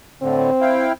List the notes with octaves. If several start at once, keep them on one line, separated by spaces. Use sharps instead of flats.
A2 D3 C4
E4 F5 G5